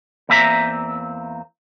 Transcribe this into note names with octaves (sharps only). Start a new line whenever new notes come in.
E2 A#3 C4 E5 G#5 A#5